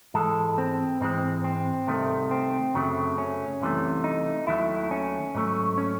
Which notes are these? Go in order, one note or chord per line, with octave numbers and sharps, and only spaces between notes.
G#2 E3 G#3 A4
C4
G#2 E3 G#3 C4
C4
C2 C3 D#3 A3
C4
F#2 C#3 F#3 A3
C#4
C2 C3 E3 A3
D#4
D#2 D#3 F#3 A3 E4
C#4
G#2 F#3 A3
C#4